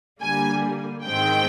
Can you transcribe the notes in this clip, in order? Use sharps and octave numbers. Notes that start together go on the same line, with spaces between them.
D3 G3 A#3 G#5
G#2 D#3 G#3 C4 G5